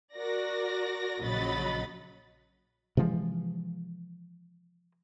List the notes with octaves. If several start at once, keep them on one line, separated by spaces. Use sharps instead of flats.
F#4 A#4 D5 A#6
A#1 C#3 F#3 D#5 B5 A6
C3 E3 F3 G#3